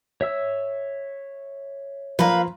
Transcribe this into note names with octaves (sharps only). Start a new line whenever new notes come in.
C#5 E5 E6
F3 A#3 B4 A#5